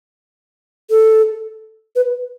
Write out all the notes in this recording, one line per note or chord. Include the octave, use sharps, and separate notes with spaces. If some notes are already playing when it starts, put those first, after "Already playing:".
A4
B4